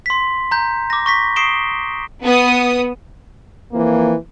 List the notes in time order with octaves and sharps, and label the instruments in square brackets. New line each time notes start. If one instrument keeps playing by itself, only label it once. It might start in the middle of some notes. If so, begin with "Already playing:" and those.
[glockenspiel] C6 B6
A#5 G6
D6 A#6
C#6 A#6 B6
C#6 D#6 C7 D7 E7 G7
[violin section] B3 D#6
[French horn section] F2 E3 F3 A#3